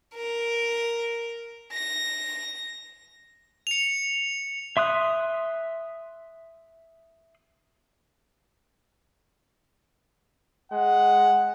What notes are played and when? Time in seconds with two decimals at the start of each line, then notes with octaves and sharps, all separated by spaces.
0.15 A#4
1.72 A#6
3.67 C#7 F7
4.77 E5 C6 D#6 F#6
10.72 G#3 F#5